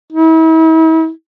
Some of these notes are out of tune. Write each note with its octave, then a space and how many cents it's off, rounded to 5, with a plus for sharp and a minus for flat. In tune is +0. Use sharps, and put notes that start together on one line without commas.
E4 -40